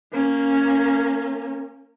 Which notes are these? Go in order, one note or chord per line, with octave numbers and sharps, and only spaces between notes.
A#3 C#4